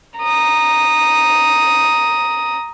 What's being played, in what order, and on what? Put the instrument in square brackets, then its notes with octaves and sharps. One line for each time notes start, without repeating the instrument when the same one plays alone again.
[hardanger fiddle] A#5 D#6